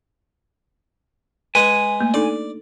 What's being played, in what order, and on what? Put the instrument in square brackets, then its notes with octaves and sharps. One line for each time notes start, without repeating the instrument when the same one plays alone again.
[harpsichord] G#3 B4 [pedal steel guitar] G#5
[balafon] A3 A#3
[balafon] D4 D#4 A4 [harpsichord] D5